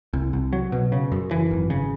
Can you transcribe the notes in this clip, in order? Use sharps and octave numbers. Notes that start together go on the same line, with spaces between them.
C2
C2
F#3
B2
C#3
F#2
E3
G#1
C#3